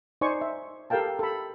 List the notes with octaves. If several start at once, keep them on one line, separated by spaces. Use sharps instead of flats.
D#4 C5 D5 G#5 C#6
E5
G4 A4 A#4 F5 G5 A5
A4 B5